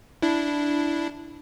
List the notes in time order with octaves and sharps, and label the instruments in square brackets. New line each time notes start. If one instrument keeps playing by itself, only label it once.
[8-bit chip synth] D4 E4